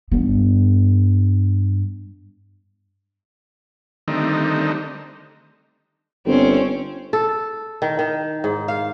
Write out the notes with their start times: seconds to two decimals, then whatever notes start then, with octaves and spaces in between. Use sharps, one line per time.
0.12 G2 B3
4.08 D3 D#3 G3 A3 C4 D#4
6.26 G1 C4 C#4
7.13 A4
7.82 D#3
7.99 D#3
8.44 G#2
8.68 F5